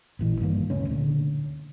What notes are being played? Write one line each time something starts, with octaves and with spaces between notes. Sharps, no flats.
A1 A#2 E3
G2 D#3 A#3
D1 C#3 A3 C#4
A#2 D3